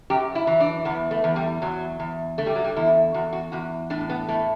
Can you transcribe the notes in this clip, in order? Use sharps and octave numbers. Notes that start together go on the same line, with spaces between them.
F#2 G4
E4
E3
D4
E2 B3
A3
E2
G3
E2 F#3
E2
D3 A3
G3
F#3
G3
E2 E4
E2 F#4
F#4
E2 F#4
A2 D4
B3
A2 A3